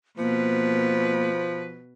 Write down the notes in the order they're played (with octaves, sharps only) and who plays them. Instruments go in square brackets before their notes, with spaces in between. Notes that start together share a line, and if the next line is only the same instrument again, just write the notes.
[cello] B2 B4 [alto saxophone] F3 [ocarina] A#3